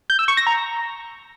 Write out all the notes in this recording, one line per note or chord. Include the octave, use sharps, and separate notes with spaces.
G6
E6
C#6
A#6
A#5